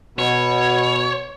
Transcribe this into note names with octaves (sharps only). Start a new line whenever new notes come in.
B2 C#5